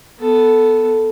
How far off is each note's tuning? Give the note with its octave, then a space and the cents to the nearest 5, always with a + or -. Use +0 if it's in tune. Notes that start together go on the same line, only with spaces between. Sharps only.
B3 +0 A4 +0